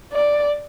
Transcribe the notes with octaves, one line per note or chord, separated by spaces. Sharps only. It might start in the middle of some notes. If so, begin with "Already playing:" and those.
D5